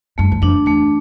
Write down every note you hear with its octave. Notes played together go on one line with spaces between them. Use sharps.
G2 A3
E2
F2 D4
E2 A3